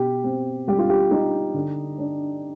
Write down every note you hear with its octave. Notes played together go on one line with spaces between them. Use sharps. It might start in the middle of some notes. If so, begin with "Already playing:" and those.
Already playing: B2 G4
C4
G3 G4
F4
G4
D#4
D3
D4